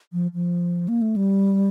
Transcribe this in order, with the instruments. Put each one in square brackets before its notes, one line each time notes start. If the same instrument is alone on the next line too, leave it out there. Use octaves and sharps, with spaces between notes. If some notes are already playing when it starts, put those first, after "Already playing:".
[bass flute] F3
F3
A#3
A3
G3